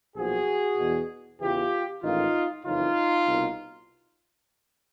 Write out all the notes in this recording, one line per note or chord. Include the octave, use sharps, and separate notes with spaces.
B1 A#2 F3 F#4 G#4
E2 B2
E2 C#3 E3 F4 G4
A1 G#2 D#3 D#4 F4
F#1 F2 C#3 E3 D#4 F4
C2 B2